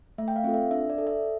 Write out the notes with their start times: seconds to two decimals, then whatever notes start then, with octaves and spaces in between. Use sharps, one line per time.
0.18 A3 E5
0.28 G5
0.36 F5
0.44 C4 F4 A4
0.54 E5
0.71 D4 E5
0.90 D5
0.98 A4
1.07 E5